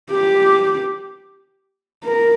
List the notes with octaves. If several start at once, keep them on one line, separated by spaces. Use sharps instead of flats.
G4
A#4